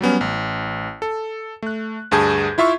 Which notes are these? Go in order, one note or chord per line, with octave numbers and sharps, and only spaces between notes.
F#3 G3 B3 C#4
A1
A4
A3 F#6
D2 G2 G#4 A5 G6 G#6
E4 F4 E5 F5 C#6